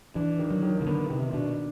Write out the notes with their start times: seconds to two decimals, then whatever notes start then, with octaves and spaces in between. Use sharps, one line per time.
0.15 E3 D4
0.39 D#3
0.50 F#3
0.63 D#3
0.80 C#3
0.86 D3 B3
1.10 C3 D#3
1.33 B2 D4